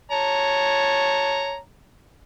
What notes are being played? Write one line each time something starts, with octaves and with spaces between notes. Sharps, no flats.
C#5 A5 A#5